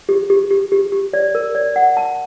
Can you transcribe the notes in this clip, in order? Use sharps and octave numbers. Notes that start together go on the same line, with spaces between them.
G4
G4
G4
G4
G4
D5
A#4
D5
F#5
A5